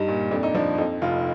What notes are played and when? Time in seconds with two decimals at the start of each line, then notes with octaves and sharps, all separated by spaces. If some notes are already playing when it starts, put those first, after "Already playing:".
Already playing: G2 G3 D#4
0.08 A#2
0.31 F2 D4
0.43 D#4
0.55 F3 D4
0.78 F2 D#4
1.02 F1 F4